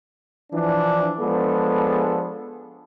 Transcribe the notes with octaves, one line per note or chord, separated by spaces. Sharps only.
E3 F3 D4
F3 G#3 B3 D4 G#4 A4